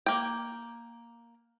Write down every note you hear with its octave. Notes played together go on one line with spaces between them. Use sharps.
A#3 G5